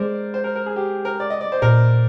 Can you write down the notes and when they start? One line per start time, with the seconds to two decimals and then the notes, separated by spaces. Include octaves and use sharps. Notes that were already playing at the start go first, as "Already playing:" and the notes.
Already playing: G#3 A#4 C5 D5
0.34 C5
0.44 A#4
0.55 A#4
0.66 G#4
0.76 G4
1.05 A#4
1.20 D5
1.30 D#5
1.41 D5
1.52 C5
1.62 A#2 A#4